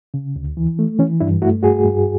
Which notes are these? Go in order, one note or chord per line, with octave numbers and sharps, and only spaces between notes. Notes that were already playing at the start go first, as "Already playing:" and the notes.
C#3
D2
E3
A3
E3 C#4
G2 D4 E4
A3 E4 F#4
G2 F#4 G#4
G2